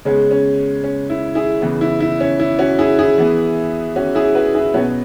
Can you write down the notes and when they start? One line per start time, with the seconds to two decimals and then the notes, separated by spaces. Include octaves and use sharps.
0.05 C#3 G#3 B3 C#4
0.31 C#4
0.84 C#4
1.10 E4
1.35 E4 G#4
1.62 C#3 E3 B3
1.81 E4
2.00 E4
2.20 C#4
2.40 E4
2.59 C#4 F#4
2.79 E4 G#4
2.99 E4 G#4
3.18 E3 B3
3.96 C#4 F#4
4.15 E4 G#4
4.35 F#4 B4
4.54 E4 G#4
4.74 B2 F#3 B3 C#4 F#4